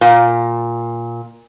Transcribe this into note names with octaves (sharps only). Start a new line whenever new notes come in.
A#2